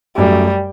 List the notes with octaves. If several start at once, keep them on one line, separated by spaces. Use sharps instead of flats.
F#2 F#3 G3 A3